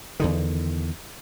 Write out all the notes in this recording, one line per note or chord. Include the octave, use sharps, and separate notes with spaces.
E2 D3 D#3